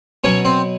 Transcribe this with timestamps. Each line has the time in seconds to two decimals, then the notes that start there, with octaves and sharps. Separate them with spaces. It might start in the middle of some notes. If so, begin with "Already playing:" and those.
0.24 B2 F#3 C#4 C#5
0.45 C4 C5